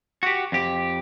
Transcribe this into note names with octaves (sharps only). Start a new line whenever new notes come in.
F#4 G4
F2 G4